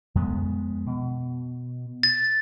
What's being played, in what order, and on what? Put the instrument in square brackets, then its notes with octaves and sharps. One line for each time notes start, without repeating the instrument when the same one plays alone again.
[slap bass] F2 G#3 B3
B2
[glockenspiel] A6